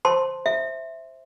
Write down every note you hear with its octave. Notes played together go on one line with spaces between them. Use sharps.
C5 A5 C6
E5